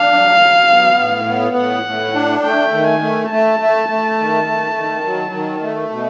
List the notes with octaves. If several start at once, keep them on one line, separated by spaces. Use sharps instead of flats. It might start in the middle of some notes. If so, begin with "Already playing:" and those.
Already playing: D4 F5
F#3
F#3
B3
A2
B3
A2 F#5
A2
D4
A3 G5
D#3
G#5
A3
A3 A5
A3
A3
D#3
A3
D#3
F#3
D#3
A3
B2